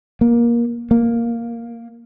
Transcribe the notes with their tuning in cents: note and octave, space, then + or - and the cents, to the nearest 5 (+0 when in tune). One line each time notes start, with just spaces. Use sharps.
A#3 +20
A#3 +0